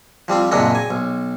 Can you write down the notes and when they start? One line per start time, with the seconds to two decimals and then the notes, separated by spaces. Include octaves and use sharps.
0.28 F3 G3 C4 F4
0.51 F#2 A#2 C#3 C4 D4 D#4
0.75 G#5
0.90 B1